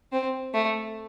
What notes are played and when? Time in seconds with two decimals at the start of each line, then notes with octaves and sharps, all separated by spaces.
0.12 C4
0.54 A3